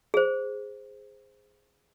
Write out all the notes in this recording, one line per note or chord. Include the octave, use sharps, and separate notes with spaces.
G#4 C5